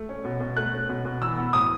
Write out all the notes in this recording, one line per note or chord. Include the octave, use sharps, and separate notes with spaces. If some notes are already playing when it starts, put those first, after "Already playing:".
Already playing: A3
C#4
B2
B2
A3 F#6
C#4
B2
B2
E3 E6
B3
A2 D#6